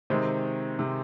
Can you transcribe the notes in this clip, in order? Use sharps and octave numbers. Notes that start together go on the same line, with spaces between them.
C3 D#3 G#3 C4
C3